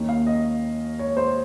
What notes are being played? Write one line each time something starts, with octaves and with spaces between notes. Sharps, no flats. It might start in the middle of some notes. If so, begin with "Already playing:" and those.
Already playing: D#2 D#3 A#3 C#4
F5
D#5
C#5
C5